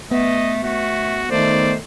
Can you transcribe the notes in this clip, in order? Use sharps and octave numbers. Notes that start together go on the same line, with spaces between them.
A3 B3 D#5
A3 F#4
D#3 A3 C5 D5